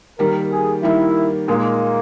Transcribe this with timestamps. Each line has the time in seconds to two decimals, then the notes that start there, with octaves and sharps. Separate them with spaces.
0.19 D#3 G3 A#3 A#4
0.51 G#4
0.83 D#3 G3 A#3 E4
1.48 A#2 G#3 A#3 D#4